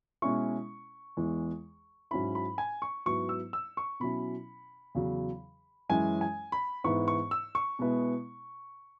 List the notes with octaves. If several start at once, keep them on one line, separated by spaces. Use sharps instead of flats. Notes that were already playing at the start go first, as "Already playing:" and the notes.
B2 G#3 C#4 E4 C#6
E2 E3 G#3
G#2 F#3 C#4 E4 B5
B5
G#5
C#6
G#2 F#3 B3 E4 C#6
E6
E6
C#6
B2 F#3 C#4 E4 B5
E2 C#3 F#3
F#2 E3 G#3 C#4 E4 G#5
G#5
B5
G#2 E3 B3 E4 C#6
C#6
E6
C#6
B2 G#3 B3 E4